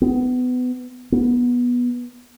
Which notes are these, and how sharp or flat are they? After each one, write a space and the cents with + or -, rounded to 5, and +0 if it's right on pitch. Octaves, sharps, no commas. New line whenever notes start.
B3 +25
B3 -15